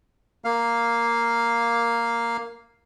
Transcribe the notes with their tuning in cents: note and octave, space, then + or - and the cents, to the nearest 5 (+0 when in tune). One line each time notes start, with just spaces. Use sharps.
A#3 +0 F5 +0